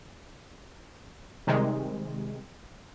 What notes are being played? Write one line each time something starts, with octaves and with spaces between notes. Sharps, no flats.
C3 D#3 G3 G#3